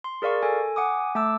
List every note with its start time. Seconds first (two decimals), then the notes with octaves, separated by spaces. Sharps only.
0.04 C6
0.22 G#4 A#4 D5 F5 C#6
0.42 A4 G#5
0.76 F#5 G#5 D6 D#6
1.15 A3 A5 D6 E6